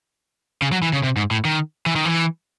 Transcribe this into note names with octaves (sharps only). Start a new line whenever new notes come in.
C#3
F#3
E3
C#3
C3
G#2
A2
D#3
E3
D#3
E3